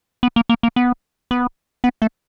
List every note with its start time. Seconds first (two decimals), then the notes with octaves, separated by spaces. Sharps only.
0.23 B3
0.36 A#3
0.49 A#3
0.63 A#3
0.76 B3
1.31 B3
1.84 B3
2.02 A3